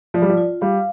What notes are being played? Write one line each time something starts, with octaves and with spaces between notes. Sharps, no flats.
F3 D5
G3
F3
F4
G3 F5